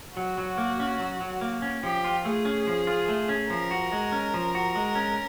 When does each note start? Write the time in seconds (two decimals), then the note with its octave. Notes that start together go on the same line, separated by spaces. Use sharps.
0.16 F#3 F#4
0.38 F#3
0.58 A#3
0.80 C#4
1.00 F#3
1.20 F#3
1.41 A#3
1.62 C#4
1.83 F3 G4
2.04 F4
2.25 A3 G#4
2.45 C#4
2.67 F3
2.87 F4
3.08 A3
3.29 C#4
3.50 F3 A#4
3.71 F#4
3.92 G#3
4.12 C#4
4.34 F3
4.55 F#4
4.75 G#3
4.95 C#4